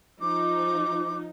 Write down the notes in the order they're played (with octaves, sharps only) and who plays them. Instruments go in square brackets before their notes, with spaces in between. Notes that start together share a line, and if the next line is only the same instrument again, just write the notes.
[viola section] F3 D#4 [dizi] D6